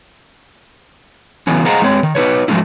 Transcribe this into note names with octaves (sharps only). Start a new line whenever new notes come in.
E3 F#3 B3 C#4
G#4 C5 D#5 F5 F#5 A#5
G#3 C4 C#5
D#3
D#4 B4 C#5
F3 F#3 G#3 A3 C#4 E4